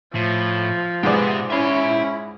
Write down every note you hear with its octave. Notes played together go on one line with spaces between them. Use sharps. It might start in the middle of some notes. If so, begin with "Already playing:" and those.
A2 F3
G#2 B3 G4 G#4 D5 E5
C#4 E4 E5 C6